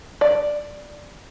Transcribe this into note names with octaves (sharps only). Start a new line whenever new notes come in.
D5